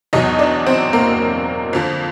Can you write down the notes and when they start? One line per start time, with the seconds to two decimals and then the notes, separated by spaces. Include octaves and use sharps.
0.13 E2 B2 F#3 D#4 D#5
0.39 D4 D5
0.66 C4 C5
0.93 A#3 A#4
1.73 F2 D3 F3